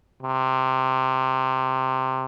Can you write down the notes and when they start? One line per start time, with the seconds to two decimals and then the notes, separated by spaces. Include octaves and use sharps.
0.22 C3